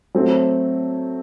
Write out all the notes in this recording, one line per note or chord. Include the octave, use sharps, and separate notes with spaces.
F#3 A3 C4